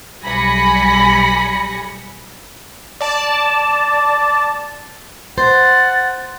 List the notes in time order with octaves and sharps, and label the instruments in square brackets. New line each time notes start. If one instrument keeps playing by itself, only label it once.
[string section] B1 G3 G#5 B5 A#6 C#7
[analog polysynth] D5 A5
[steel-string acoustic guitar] C5 [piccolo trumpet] F#5 [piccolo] A6